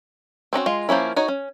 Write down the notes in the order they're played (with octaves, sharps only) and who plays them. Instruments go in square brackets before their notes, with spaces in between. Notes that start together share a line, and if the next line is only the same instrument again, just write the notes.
[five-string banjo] C4 C#4 D#4 F#4
G#3 F4
F3 A#3 C#4 E4
D#4 F#4 C#5
C#4